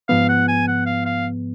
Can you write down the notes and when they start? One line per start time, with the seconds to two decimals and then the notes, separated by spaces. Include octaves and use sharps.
0.09 G#2 F3 B3 F5
0.29 F#5
0.48 G#5
0.68 F#5
0.86 F5
1.06 F5